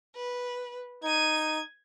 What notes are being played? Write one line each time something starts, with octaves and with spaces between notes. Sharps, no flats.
B4
D#4 G#6 D#7